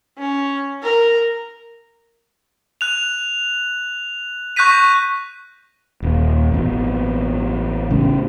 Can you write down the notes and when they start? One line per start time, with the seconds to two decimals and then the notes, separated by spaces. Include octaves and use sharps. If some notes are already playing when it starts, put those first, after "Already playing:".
0.18 C#4
0.83 A#4
2.81 F#6 F7
4.56 C#6 F#6 G6 A#6 B6 D#7
6.02 D#1
6.52 A1 B2
7.90 A2 C#3